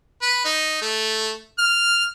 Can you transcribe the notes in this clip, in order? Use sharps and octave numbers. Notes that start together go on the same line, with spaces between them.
B4
D#4
A3
F6